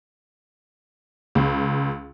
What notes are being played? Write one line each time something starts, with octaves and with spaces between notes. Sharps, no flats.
C#2